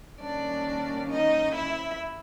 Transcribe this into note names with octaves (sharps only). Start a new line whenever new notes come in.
D#3 G3 A#3 C#4 D4 D5
D#4 D#5
E4 E5